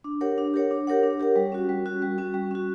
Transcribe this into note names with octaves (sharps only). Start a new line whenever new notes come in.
D4
G4 A#4 C#5 F#5
D4
G4 A#4 C#5 F#5
D4
G4 A#4 C#5 F#5
D4
G4 A#4 C#5 F#5
G3
C#4 F#4
G3
C#4 F#4
G3
C#4 F#4
G3
C#4 F#4